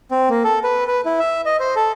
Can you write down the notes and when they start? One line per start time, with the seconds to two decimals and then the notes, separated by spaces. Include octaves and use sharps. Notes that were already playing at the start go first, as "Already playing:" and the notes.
0.11 C4
0.30 A#3
0.44 A4
0.64 B4
0.87 B4
1.05 E4
1.20 E5
1.46 D#5
1.60 C5
1.76 A4